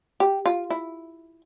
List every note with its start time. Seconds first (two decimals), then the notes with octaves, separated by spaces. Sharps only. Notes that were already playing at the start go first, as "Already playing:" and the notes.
0.20 G4
0.46 F4
0.70 E4